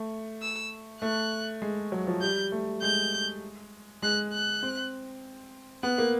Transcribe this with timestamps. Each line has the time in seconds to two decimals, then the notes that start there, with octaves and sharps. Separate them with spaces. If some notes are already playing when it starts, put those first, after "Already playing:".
Already playing: A3
0.42 E6
1.02 A3 F#6
1.62 G#3
1.92 F#3
2.07 F3
2.21 G3 G6
2.52 A3
2.82 G#3 G6
4.02 G#3 F#6
4.33 F#6
4.63 C4
5.83 B3 F#6
5.98 A#3